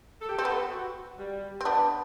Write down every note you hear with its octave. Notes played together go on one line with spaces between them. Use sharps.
A4
G4
C4 A4
B3
F#4
G3
C4
B3 D4